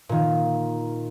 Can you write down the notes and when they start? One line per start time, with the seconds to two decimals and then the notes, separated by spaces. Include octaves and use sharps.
0.09 A#2 D#3